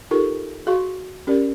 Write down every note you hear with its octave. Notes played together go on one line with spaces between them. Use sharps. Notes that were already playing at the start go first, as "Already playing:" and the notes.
D#4 F4 G4 A4 A#4 C#6
F#4 G#4 F5 C6 C#6
C#4 G4 A#4 D5